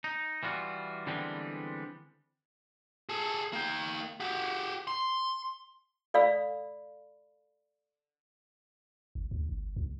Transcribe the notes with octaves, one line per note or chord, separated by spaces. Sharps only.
D#4
E3 G3 F4 F#4
D3 E3 G3 G#3 B3 C4
G#4 A4
A#3 G5
F#4 G4
C6
A4 D5 F5 B5 E6
G1
D2
G1
C#2